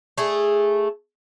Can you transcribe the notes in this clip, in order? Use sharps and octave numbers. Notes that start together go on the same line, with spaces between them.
A3 G#4